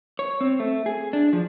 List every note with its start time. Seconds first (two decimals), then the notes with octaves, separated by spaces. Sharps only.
0.19 C#5
0.41 C4
0.60 A3
0.86 G#4
1.13 D4
1.33 F3